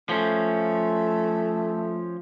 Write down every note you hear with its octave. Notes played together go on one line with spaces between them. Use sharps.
F3 A3 C#4